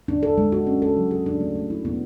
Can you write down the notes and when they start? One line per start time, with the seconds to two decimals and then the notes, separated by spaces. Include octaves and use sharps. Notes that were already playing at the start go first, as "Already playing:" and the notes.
0.08 D4
0.23 A4
0.38 G#3
0.52 F#4
0.67 C#4
0.82 A4
0.97 F#3
1.11 G#4
1.26 D4
1.41 A3
1.55 A3
1.70 E4
1.85 B3